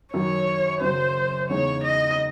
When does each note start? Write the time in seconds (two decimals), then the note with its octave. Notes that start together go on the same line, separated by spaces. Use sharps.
0.14 F#2 D#3 F#3 C#5
0.81 F#2 C#3 F#3 C5
1.49 E2 C#3 G#3 D#4 C#5
1.84 D#5